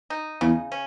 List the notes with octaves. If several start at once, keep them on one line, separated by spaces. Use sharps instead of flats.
D#4
E2 C#3
C#4